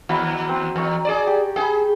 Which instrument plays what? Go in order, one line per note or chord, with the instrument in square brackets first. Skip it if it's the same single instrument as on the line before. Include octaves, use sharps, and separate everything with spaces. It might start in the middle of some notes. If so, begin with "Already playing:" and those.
[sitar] D#2 [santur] F#4 A#5 B5
[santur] C4
[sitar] E2 [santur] A#5 C#6
[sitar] G#4 D5
[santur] G4
[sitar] G#4 [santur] G5 B5